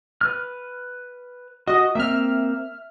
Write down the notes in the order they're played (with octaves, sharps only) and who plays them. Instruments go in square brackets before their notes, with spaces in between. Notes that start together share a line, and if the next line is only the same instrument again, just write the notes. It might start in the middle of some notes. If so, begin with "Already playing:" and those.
[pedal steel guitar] B4 F6
[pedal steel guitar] F#4 [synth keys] D#5
[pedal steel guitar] A#3 C4 [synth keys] E5 F6